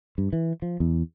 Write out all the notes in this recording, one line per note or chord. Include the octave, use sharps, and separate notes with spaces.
G2
E3
F3
E2